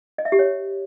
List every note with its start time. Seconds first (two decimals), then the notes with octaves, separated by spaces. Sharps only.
0.18 D#5
0.25 E5
0.32 G4
0.39 C#5